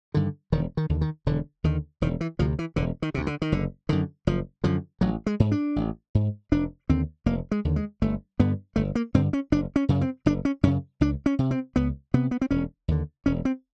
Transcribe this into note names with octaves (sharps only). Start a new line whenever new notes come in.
G2 D3 D#3
E1 D#3
D#3
D#2 D3
D#3
E1 D3
D#2 D3 D#3
E1 D#3
E3
D2 C3 F3
E3
E1 D3
D#3
D2 C3
D3
D#3
F#1 D3
F#2 D3 D#3
F#1 F3
F#2 D3 F3
A1 F#3
G#3
G#2
D4
A1
G#2
F1 D4
D#2 D3 C4
F1 A#3
G#3
D#2 D3
G#3
G1 A3
G2 D3 B3
G1 A3
A#3
G2 D3 C4
C#4
F#1 D4
C#4
F#2 C#3
C4
F#1 D4
C#4
F#2 C#3 C#4
C#2 D4
C#4
C3
C4
C#2 B3
C3 B3
B3
C4
E1 C#4
D#2 D3
E1 C#4
C4